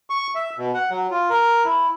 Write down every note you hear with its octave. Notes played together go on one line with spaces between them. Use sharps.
C#6
E5
B2
F#5
F#3
F4
A#4
E4